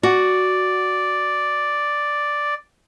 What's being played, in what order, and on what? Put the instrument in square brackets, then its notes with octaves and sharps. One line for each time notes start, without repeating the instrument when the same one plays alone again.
[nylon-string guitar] F#4 [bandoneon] D5